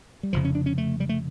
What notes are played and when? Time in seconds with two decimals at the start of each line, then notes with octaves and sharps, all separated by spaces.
0.23 G3
0.33 F1 F2 C#3 F3
0.45 C#4
0.55 D4
0.66 C#4
0.78 A3
1.00 G3
1.09 A3